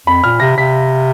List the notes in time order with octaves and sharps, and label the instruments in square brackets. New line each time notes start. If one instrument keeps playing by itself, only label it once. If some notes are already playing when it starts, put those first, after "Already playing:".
[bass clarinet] F2 [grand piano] B5
[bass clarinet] A#2 [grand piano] F6
[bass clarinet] C3 [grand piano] A#6
[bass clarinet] C3 [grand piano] B6